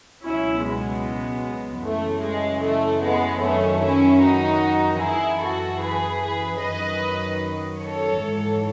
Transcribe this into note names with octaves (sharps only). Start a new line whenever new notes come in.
C#2 B2 F#3 C#4 E4
G#3 B3
F#2 C#3 E3 A3
G#3
A3
G#3 B3
F#2 D#3 F#3 A3 C#4
C#4 E4
D#4 F#4
F#2 E3 E4 G#4
F#4 A4
G#4 B4
G#4 B4
F#2 D#3 F#3 B4 D#5
A4 C#5
G#1 G#2 E3